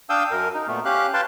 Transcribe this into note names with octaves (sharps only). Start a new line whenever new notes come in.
D4 F5 G5 D#6 E6 G6
F#2 A#4
D#4
A#2 A3 B3
C#4 G4 F5 F#6
B4 F5 G5 A5 C6